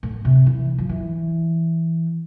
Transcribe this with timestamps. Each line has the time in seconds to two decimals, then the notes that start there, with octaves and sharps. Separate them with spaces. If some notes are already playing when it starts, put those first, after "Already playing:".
0.03 A2
0.25 C3
0.46 E3
0.78 F3
0.89 E3